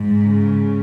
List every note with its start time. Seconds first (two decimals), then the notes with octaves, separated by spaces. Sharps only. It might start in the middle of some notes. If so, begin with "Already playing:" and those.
Already playing: G#2
0.21 C#3